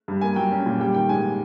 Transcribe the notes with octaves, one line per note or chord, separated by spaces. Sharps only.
G2
A#3 G#5
F#3 G5
C#4
A#2
G3 G5
D#3 G5
G#2 G#5